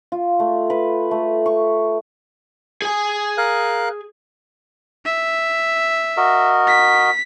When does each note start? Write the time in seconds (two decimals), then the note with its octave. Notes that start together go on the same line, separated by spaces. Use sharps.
0.12 F4
0.40 A3
0.70 B4
1.11 A3
1.46 C#6
2.82 G#4 G#5
3.38 A#4 F5 F#6
5.05 E5
6.17 F#4 A#4 D#5
6.67 B6